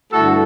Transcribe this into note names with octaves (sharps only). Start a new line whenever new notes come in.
G2 D3 A3 E4 F#4 A4